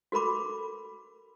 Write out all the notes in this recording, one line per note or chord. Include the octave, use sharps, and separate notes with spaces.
F#4 A4 A#4 B5 D6